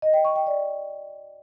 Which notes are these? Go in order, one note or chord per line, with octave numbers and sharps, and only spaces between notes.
D#5
G5
C#6
G5
D5